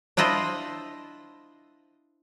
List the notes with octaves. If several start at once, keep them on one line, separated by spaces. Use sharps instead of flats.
D4 E4 F4 C5 D#5